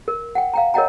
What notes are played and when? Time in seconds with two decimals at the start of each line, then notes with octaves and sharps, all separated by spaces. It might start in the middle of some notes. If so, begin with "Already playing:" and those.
0.08 A#4
0.35 F#5 G5
0.54 F5 G5 A#5
0.74 A#4 C#5 D#5 F#5 G5 A#5